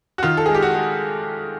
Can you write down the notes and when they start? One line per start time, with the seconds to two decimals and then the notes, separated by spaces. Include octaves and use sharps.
0.18 F#4
0.23 D#3 F4
0.37 A4
0.46 G#3 G#4
0.55 G4
0.62 F#4
0.75 G#3